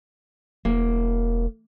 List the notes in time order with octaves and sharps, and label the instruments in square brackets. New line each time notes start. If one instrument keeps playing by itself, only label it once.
[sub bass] E1 [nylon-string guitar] A#3